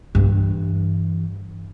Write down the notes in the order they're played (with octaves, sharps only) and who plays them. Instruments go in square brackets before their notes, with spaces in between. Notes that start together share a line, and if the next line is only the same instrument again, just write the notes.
[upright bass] G2 E3